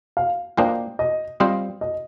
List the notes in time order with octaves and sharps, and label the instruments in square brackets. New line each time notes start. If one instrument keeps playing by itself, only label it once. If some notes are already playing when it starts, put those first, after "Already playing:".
[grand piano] F5
[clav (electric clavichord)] A#3 D4 F4 C5 D#5 [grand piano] G5
[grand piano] D#5
[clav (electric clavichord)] G3 C4 F4 C5 D#5
[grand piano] D#5